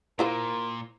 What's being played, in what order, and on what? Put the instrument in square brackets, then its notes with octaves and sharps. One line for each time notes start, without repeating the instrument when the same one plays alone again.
[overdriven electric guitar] A#2 [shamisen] E4 F4 C5 [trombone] A#4